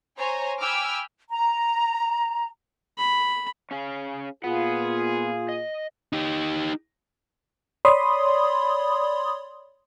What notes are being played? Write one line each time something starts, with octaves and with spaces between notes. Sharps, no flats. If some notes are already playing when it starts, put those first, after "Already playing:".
C5 C#5 G#5 A#5
G5 G#5 B5 D6 E6 F6
A#5
B5
C#4 G#4 F5
A#2 B3 F4 G#4 F#5
D#5
D#4 G4
C#5 D5 B5 C6 D#6